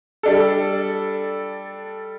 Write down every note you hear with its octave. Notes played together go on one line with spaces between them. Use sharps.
G3 D4 A4